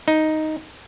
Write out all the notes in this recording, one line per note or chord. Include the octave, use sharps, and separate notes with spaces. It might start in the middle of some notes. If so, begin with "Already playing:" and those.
D#4